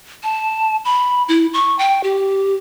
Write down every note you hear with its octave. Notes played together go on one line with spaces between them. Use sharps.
A5
B5
E4
C#6
G5
G4